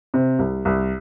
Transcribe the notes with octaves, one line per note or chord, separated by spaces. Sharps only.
C3
C2
C2